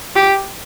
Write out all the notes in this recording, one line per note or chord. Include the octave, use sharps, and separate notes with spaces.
G4